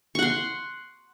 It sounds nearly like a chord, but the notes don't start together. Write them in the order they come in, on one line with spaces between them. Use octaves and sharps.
C#6 F#5 C6